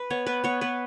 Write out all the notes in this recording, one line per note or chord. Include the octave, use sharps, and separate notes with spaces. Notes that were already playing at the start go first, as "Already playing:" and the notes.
Already playing: B4
B3 C#5
B3 B4
B3 C#5
B3 B4